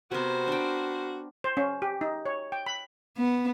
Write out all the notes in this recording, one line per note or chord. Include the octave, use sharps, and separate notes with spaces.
C3 B3 F#4 A#4 C5
D4 G5
C5
C#4
G4
D#4
C#5
G5
B5
B3